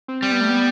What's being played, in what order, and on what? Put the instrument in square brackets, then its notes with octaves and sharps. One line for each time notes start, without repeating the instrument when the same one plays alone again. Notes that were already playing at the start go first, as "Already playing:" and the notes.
[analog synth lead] C4
[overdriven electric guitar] G3 [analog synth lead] C4
[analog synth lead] B3
A3
B3